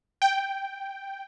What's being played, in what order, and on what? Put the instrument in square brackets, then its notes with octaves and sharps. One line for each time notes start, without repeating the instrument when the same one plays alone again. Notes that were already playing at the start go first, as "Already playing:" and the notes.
[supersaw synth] G5